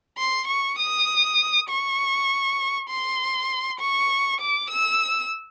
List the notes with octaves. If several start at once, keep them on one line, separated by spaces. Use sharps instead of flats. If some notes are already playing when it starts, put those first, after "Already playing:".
C6
C#6
D#6
C#6
C6
C#6
D6
E6